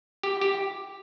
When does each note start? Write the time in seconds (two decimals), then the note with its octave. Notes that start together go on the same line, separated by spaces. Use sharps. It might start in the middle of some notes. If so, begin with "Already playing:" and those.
0.23 G4
0.41 G4